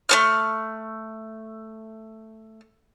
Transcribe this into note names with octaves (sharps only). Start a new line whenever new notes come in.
A3 B3 F6